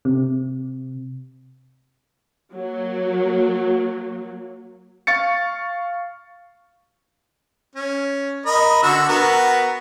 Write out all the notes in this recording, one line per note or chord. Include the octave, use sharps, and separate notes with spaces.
C3
F#3 A#3
F5 C#6 A6 C#7
C#4
A#4 D#5 B5
D3 F#4 E6
B3 F#4 A#4